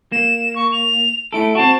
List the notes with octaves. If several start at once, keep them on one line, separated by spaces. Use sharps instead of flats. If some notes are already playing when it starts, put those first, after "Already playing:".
A#3 E7
C#6
F7
A3 E4 A4 D7
C4 F#4 A5